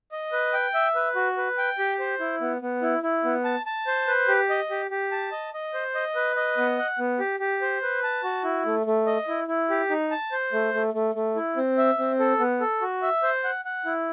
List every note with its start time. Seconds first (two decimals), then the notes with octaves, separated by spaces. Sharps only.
0.12 D#5
0.32 B4
0.53 G5
0.74 E5
0.95 B4
1.16 F#4
1.37 B4
1.58 G5
1.79 G4
1.99 C5
2.20 E4
2.41 B3
2.62 B3
2.82 E4
3.03 E4
3.24 B3
3.45 A5
3.66 A5
3.87 C5
4.07 B4
4.28 G4
4.50 D#5
4.70 G4
4.91 G4
5.12 A5
5.32 D#5
5.54 D#5
5.74 C5
5.95 D#5
6.15 B4
6.36 D#5
6.57 B3
6.79 F#5
6.99 B3
7.19 G4
7.40 G4
7.61 C5
7.82 B4
8.03 A5
8.24 F#4
8.44 E4
8.65 A3
8.86 A3
9.06 D#5
9.28 E4
9.48 E4
9.70 G4
9.90 D#4
10.11 A5
10.32 C5
10.53 A3
10.74 A3
10.94 A3
11.15 A3
11.36 E4
11.56 C4
11.78 E5
11.98 C4
12.19 A4
12.39 B3
12.61 A4
12.81 F#4
13.02 E5
13.23 C5
13.44 F#5
13.65 F#5
13.86 E4